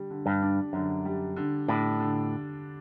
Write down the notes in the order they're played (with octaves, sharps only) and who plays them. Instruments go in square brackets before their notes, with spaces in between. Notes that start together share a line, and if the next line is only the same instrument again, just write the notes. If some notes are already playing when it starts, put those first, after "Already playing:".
Already playing: [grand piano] D3 G3
D3
[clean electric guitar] G2
[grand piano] D4
[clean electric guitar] F#2 [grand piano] D3
[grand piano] G3
D3
[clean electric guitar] A2 [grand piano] D4
[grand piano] D3